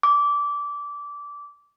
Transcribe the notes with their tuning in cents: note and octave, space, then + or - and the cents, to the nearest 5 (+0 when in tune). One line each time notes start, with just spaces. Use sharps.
D6 -20